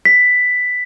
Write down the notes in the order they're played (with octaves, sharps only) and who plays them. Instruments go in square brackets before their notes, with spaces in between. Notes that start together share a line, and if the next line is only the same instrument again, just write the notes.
[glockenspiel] B6